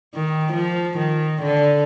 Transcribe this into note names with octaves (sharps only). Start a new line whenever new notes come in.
D#3
F3
D#3
D3